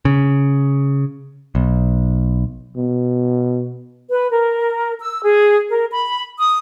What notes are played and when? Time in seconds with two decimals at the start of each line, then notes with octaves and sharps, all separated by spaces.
0.05 C#3
1.55 B1
2.76 B2
4.09 B4
4.30 A#4
4.99 E6
5.23 G#4
5.69 A#4
5.91 B5
6.38 D#6